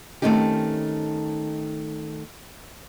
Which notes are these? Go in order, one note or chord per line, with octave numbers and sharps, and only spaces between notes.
D#3 A3 C4 C#4 D#4 G4